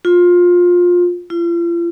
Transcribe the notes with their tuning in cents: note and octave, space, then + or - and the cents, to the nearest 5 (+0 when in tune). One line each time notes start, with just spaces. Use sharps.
F4 +20
F4 -40